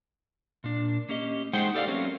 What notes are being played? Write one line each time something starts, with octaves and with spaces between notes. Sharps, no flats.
A#2 D4
A#3 C#4 G4 D#5
G#3 D#4 G#4 C5 F#5 G5
G4 A4 D5 F5
F#3 A3 A#3 C4 C#4